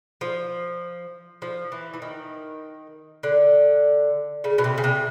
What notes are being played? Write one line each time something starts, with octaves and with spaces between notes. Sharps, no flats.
F3
F3
E3
E3
D#3
D3
C#3
B2
C3
C#3
C3